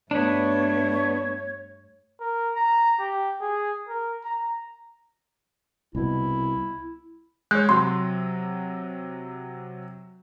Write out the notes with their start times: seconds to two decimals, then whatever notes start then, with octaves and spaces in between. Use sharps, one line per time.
0.11 G2 A3 B3 D4 C#5
2.20 A#4
2.55 A#5
2.99 G4
3.41 G#4
3.89 A#4
4.24 A#5
5.95 C2 B2 E4
7.51 G#3 C#5 F#6 G6
7.69 C3 F#3 C6